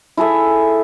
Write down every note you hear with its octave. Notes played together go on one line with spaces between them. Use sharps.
E4 G#4 A4 E5